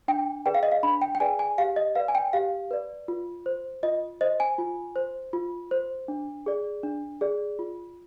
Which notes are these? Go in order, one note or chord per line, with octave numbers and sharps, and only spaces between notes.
D4 G5
G#4 B4 D5 G5
F5
D#5
F5
D4 B5
G5
G5
G#4 B4 D5 G#5
G#5
G4 F5
D#5
B4 D5 F5
G#5
G5
G4 F5
B4 D5
F4
C5
F4 D#5
C5 D#5
G#5
F4
C5
F4
C5
D4
G#4 D5
D4
G#4 D5
F4